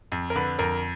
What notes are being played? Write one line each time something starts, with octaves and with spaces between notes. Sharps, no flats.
F2
A#4
D3 B4
F2 A#4